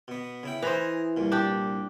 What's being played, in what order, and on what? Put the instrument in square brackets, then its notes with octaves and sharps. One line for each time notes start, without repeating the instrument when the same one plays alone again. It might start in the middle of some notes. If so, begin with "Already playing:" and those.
[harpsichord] B2 B3
C#3 E4 G5
[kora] E3 C5 [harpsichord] D#5 G#5 A#5
[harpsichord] C2 A#2
[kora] D4 G4